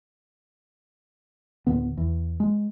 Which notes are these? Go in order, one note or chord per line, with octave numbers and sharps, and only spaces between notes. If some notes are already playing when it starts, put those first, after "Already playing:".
D1 G1 D3 B3
E2
G#3